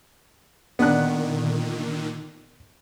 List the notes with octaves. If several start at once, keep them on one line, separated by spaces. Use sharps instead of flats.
A#2 D3 D#3 B3 D4 F#6